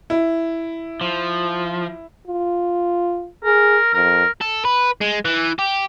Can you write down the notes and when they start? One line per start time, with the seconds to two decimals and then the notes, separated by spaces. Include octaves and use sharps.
0.10 E4
1.01 F3
2.27 F4
3.44 G#4 A#4
3.94 F2 A#4
4.41 A4
4.65 B4
5.01 G#3
5.25 E3
5.59 G4